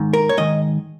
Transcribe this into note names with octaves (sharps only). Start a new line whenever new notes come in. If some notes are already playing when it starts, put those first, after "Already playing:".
Already playing: G#2 D#3
A#4
C#5
G#2 D#3 D#5